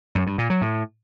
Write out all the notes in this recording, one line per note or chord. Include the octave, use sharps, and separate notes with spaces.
F#2
G2
A#2
F#3
A2